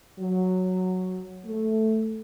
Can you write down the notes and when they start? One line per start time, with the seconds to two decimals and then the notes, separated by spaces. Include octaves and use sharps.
0.20 F#3
1.46 A3